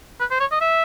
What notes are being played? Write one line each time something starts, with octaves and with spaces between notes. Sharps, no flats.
B4
C5
C#5
D#5
E5